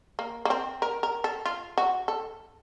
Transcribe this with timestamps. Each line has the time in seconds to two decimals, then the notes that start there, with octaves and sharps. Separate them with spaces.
0.19 A#3
0.45 A#3
0.50 C4
0.82 A#4
1.03 A#4
1.24 A4
1.45 F4
1.78 F#4
2.08 A4